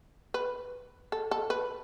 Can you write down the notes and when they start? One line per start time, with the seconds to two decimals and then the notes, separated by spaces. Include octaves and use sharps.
0.34 B4
1.12 A4
1.31 A4
1.50 B4